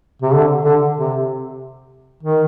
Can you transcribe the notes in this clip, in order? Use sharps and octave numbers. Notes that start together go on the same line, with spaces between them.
C3
D3
D3
C3
D#3